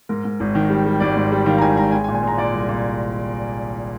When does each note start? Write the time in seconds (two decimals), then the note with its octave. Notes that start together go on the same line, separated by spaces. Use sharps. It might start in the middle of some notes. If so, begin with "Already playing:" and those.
0.09 G#2 A#4
0.24 G#2
0.40 G#1
0.55 D#3
0.70 G3
0.86 G3
1.00 G#1 D5
1.16 G#2
1.32 G3
1.46 D#3 F5
1.58 A#5
1.61 G#1 G#5
1.77 G#1 A#5
1.92 G#3 G#5
2.04 G#5
2.08 A#2
2.15 G#5
2.23 G#3 A#5
2.38 A#2 D5
2.54 C2
2.69 A#2